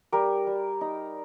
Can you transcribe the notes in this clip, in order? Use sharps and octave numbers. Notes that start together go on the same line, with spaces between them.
G3 G4 A#4
G3
D#4